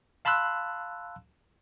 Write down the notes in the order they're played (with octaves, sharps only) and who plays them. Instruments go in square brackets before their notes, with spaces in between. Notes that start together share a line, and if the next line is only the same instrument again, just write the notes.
[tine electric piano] F5 A5 B5 C6 E6 F#6